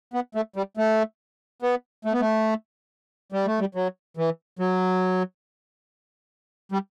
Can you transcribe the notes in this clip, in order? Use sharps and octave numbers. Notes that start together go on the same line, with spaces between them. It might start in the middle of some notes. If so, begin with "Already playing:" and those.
B3
A3
G3
A3
B3
A3
B3
A3
G3
A3
G3
F#3
E3
F#3
G3